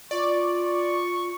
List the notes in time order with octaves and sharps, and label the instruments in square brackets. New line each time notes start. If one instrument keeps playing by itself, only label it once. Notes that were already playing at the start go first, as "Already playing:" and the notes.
[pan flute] F4 [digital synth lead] D5 [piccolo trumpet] C#6
[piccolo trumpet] C#6